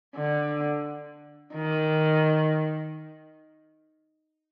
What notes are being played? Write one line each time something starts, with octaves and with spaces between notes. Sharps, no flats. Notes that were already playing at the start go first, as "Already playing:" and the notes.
D3
D#3